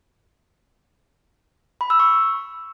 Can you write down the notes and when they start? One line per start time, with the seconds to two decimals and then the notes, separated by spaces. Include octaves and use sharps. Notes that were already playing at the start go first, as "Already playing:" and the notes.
1.81 B5
1.90 E6
2.00 C#6